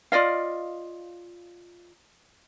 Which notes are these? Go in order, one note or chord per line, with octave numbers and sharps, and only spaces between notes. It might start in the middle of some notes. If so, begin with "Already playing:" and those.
F4 D5 D#5 F5